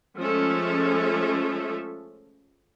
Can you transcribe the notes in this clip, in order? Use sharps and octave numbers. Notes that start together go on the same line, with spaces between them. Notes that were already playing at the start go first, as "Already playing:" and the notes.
F3 G#3 A3 C#4 A4 E5